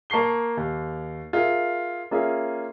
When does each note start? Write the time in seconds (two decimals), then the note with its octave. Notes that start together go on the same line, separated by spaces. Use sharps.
0.10 A#3 A5 C#6 C7 G7
0.57 D#2
1.33 F4 G#4 A#4 E5
2.11 A#3 C#4 F4 G#4 E5